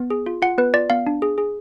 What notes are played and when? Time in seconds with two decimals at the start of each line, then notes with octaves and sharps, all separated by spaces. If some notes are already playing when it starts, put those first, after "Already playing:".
Already playing: B3
0.10 G#4
0.26 F4
0.42 F4 F#5
0.58 B3 B4
0.74 F4 D5
0.90 B3 F5
1.07 D4
1.22 G#4
1.38 G#4